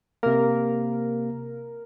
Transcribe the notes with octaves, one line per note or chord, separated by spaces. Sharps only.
C3 A#3 A#4